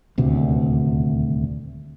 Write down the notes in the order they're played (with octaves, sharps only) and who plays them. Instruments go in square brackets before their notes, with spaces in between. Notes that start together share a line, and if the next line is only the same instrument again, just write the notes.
[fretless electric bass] D#1 D2 C3